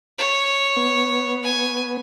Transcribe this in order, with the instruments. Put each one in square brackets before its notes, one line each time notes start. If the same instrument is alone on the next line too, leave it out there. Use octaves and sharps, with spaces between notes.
[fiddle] C#5
[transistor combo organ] B3
[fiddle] G#5